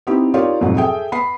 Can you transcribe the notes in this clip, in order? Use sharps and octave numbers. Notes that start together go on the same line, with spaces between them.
B3 C4 D#4 E4 G4
D#4 F4 G4 A#4 C#5 D5
F2 G#2 B2 F#3
G#4 A4 E5 G5
B3 B5 C7